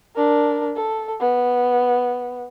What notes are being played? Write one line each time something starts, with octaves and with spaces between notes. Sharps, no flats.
D4 A#4
A4
B3